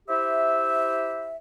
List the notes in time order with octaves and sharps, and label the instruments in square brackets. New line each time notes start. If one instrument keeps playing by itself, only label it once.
[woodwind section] E4 G4 C5 E5